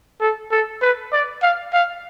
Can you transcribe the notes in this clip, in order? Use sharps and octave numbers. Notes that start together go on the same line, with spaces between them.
A4
A4
B4
D5
F5
F5